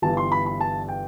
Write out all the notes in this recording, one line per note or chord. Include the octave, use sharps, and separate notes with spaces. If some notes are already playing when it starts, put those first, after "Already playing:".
G1 G2 E3 A5
C6
B5
B5
A5
G5